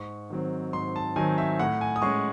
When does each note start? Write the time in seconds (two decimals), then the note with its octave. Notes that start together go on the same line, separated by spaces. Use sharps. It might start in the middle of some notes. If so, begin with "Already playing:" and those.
Already playing: G#2 C#6
0.30 D#3 F#3 C4
0.73 G#2 C6
0.96 A5
1.16 D#3 F#3 C4 G#5
1.38 E5
1.59 A2 F#5
1.81 G#5
1.96 D#6
2.02 G#3 C#4 C#6